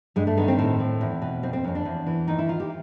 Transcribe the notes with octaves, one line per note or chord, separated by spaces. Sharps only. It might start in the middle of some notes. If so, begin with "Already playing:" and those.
G2 G#3
A3
D#3 B3
C4
A2 C4
A2
E2
B2
F2 C4
C4
F2 C#4
D4
E2
E3
D#3 D#4
E4
D#3 F4
G4